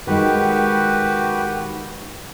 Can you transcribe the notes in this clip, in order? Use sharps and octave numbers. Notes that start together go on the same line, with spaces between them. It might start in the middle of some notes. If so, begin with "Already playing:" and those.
D#3 G#3 F#4 G4 B4